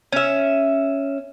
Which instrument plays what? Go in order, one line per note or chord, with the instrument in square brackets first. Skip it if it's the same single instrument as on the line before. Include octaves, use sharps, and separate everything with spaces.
[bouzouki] C#4 E5